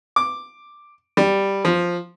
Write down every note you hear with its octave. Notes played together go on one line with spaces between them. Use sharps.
D6
G3
F3